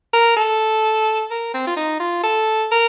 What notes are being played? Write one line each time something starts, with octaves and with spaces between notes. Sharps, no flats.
A#4
A4
A#4
C4
F4
D#4
F4
A4
A#4